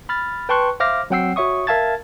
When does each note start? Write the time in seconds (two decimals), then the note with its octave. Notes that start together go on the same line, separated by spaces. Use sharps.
0.09 B5 F6 A6
0.49 B4 G5 A5 C6 C#6 F#6
0.80 C5 E5 F5 D6 F6 A#6
1.10 F#3 C4 F#5 G5 E6 C7
1.36 F#4 C#5 E5 C#6 D#6
1.67 A#4 E5 F5 A5 G#6 A6